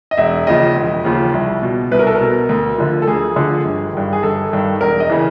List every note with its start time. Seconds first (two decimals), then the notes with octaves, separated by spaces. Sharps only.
0.11 D#5
0.17 E1 E5
0.47 D#2 C#3 F3 D#5
0.76 E1
1.05 D#2 C#3 F3
1.33 C2
1.62 B2
1.91 C2 B4
1.99 A#4
2.07 A4
2.15 A#4
2.21 B2
2.49 D2
2.78 D3 F3
3.02 A4
3.07 D2 G#4
3.36 D3 F3
3.65 G1
3.94 G2 D#3
4.13 G#4
4.23 G1 A4
4.52 G2 D#3
4.81 E1 A#4
5.00 D#5
5.09 C#3 E3